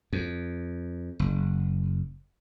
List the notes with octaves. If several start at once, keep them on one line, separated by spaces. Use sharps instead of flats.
F2
F#1